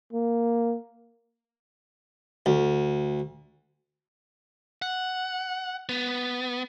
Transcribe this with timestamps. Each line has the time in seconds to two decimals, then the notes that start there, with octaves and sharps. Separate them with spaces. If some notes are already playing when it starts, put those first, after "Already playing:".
0.13 A#3
2.46 D2
4.82 F#5
5.89 B3